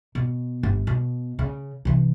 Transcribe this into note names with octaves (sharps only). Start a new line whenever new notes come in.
B2
G1
B2
C#3
C3 E3